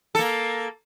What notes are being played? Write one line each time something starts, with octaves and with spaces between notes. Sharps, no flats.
A#3 A4